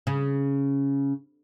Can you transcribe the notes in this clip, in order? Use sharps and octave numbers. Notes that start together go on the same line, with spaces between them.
C#3